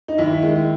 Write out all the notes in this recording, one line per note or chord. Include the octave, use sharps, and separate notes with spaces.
D#4
D#2 E4
D#3 G#3